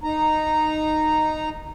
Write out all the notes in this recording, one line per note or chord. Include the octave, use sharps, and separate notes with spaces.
D#4 A#5